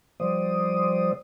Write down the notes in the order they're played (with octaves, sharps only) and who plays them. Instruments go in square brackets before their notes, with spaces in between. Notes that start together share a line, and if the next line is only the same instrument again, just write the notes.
[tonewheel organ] F3 G3 C5 D5 D#6